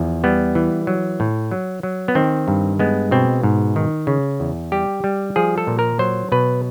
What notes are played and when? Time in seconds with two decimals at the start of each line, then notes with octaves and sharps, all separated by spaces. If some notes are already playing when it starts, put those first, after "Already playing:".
Already playing: E2 F3
0.24 G3 B3
0.55 E3
0.87 F#3
1.20 A2
1.52 F#3
1.83 F#3
2.08 B3
2.15 D#3 C4
2.48 G2
2.79 G#3 B3
3.11 B2 C4
3.43 G#2
3.76 D#3
4.07 C#3
4.40 E2
4.72 G3 G4
5.04 G3
5.36 F3 G#4
5.58 A4
5.67 A#2
5.79 A#4
5.99 F#3 C5
6.32 B2 B4